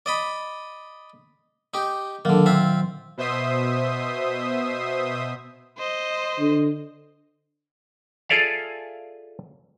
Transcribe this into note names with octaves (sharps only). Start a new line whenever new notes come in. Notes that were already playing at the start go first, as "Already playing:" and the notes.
D5 D#5 B5
D#4 G4
A#2 D3 D#3 F#3 A#3
C4 F4 E5
B2 C5 E5 C6 D#6
C5 D#5
D3
F4 G#4 A4 D5 E5 F5